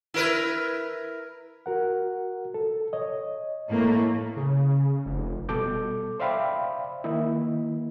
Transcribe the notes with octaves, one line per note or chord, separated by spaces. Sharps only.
E4 A#4 B4
F#4 A#4 F#5
A4
C#5 D#5
A2 A3 A#3
C#3
F1
B2 G3 A4 D6 G6
C5 D5 E5 F5 G5 B5
D#3 A#3 D#4 E4